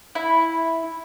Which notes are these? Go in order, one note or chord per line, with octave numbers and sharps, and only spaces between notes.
E4